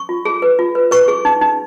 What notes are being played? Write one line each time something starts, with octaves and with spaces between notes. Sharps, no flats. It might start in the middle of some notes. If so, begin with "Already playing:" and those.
Already playing: C#6
F4
G#4
B4
F4
B4
B4 C#6
G#4
D#4
D#4